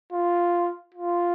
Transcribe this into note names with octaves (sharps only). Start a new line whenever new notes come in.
F4
F4